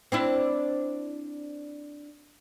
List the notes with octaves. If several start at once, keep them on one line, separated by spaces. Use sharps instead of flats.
C4 D4 E4